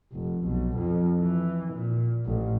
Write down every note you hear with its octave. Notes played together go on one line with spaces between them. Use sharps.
F1
B1
F2
E3
A#2
A1